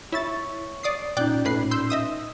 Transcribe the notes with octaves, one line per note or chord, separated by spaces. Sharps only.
E4 C#5 E5 C#6 A6
D5 D#6 C7
A#2 C#4 D#4 D5 G5 F#6
A2 B4 C7
C6 E6 G6
D#5 E5 D#6